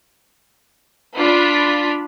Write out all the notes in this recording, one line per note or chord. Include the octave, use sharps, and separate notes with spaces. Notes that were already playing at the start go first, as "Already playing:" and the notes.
D4 F4 B5